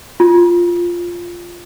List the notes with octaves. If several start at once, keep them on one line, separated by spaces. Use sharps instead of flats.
F4